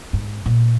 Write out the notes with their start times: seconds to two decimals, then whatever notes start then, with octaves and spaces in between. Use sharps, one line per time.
0.13 G#2
0.46 A#2